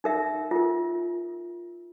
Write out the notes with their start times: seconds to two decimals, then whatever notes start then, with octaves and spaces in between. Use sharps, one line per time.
0.04 D#4 A#4 E5
0.51 F4 A#4